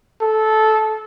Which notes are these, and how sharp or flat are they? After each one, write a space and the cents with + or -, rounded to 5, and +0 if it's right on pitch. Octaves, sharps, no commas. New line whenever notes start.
A4 -15